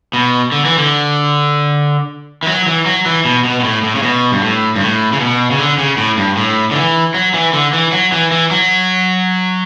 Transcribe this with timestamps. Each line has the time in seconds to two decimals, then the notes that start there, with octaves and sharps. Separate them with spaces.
0.13 B2
0.52 D3
0.65 E3
0.78 D3
2.43 E3
2.47 F#3
2.67 E3
2.86 F#3
3.06 E3
3.25 B2
3.45 B2
3.60 B2
3.64 A2
3.83 A2
3.95 C#3
4.03 B2
4.32 G2
4.42 A2
4.76 G2
4.81 A2
5.13 C#3
5.20 B2
5.51 C#3
5.59 D3
5.78 C#3
5.97 A2
6.17 G2
6.37 A2
6.71 D3
6.76 E3
7.14 F#3
7.34 E3
7.53 D3
7.73 E3
7.92 F#3
8.12 E3
8.32 E3
8.51 F#3